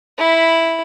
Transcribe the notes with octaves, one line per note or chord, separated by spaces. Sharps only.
E4 B5